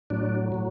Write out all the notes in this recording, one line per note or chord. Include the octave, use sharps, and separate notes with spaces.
A2 F#3 D4
A2 F#3